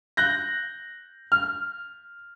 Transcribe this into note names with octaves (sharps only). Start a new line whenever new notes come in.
F#6 G6 A#6
F6